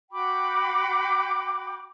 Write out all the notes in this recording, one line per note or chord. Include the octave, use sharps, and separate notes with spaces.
F#4 G5 B5 D6